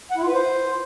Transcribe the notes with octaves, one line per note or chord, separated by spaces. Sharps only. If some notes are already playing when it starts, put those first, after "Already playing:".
F#5
E4
F4
B4
C5